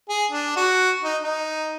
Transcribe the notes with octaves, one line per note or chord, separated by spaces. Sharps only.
G#4
D4
F#4
D#4
D#4